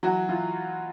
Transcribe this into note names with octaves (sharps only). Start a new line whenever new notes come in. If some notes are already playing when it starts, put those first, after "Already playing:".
E3 F#3 F#4
E3 F4